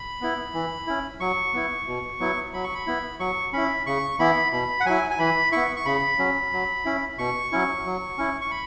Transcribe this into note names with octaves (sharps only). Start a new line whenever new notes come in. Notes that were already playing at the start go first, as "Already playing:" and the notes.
Already playing: B5
B3 E4
E3
C#4 E4
F#3 C#6
B3 E4
B2
F#3 B3 E4
F#3 B5
C#6
B5
B3 E4
F#3 C#6
C#4 E4 B5
C#3 C#6
E3 B3 E4 B5
B2 B5
F#5
F#3 E4 G#5
G#5
E3 B5
B3 E4 C#6
C#6
C#3 B5
F#3 C#4
F#3
C#4 E4
B2 C#6
F#3 C#4 E4
F#3
C#4 E4
C#6
B5